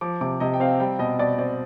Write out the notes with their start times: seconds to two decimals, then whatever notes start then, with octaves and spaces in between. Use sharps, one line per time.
0.01 F3 D6
0.21 C3 D6
0.40 C3 D#5
0.54 G5
0.60 C4 F5
0.80 G3 G5
0.99 B2 D#5
1.19 B2 D5
1.39 C4 D5